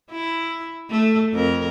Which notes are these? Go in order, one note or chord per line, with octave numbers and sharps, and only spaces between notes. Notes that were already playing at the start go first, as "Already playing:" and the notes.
E4
A3
F2 A#4